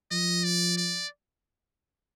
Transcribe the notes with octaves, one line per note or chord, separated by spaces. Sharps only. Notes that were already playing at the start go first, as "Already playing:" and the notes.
F3 D#5
D5
D5